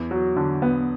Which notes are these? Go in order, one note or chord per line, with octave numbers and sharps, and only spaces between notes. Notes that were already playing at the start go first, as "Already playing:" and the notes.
Already playing: E2
F#3
D3
B3